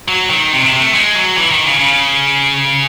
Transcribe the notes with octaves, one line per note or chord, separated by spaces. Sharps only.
F#3
D#3
C3
C3
A3
G#3
F#3
E3
D#3
C#3
C#3